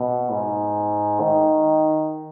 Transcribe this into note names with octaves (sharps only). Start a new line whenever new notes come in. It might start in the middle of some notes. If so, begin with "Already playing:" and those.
Already playing: B2
G#2
D#3